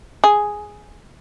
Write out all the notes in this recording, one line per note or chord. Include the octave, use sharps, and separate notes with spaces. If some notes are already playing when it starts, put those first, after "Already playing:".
G#4